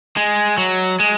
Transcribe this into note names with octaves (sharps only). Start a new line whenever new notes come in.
G#3
F#3
G#3